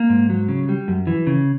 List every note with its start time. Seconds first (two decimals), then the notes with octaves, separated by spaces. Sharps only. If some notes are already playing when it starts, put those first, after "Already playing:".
Already playing: A#3
0.09 G#2
0.30 F#3
0.48 C#3
0.69 G3
0.88 F#2
1.07 E3
1.27 C#3